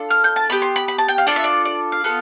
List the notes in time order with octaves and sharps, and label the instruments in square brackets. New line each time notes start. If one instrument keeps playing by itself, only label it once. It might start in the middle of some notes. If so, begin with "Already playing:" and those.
Already playing: [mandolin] D4 F4 A4
F6
G6
A5
B3 E4 G4 B5
C6
B5
B5
A5
G5
F5
D4 F4 A4 D5
E5
D5
D5
F5
B3 F4 A4